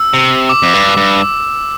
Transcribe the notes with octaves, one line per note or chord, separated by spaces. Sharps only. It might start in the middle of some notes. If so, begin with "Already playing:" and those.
Already playing: E6
C3
D6
F2
G2
G2